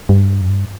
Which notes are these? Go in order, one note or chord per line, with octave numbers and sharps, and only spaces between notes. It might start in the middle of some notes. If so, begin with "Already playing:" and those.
G2
F#2
G2